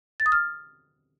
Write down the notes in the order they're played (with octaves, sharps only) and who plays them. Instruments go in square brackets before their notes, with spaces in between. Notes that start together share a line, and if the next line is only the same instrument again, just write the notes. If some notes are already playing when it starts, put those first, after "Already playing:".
[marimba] A6
D#6
F6